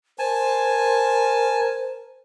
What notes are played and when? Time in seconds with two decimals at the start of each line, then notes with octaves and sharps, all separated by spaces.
0.19 A#4 C5 G#5 A5